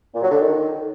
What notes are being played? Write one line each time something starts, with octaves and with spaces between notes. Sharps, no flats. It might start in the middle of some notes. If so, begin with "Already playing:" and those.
A#2
F#3
D3
D#3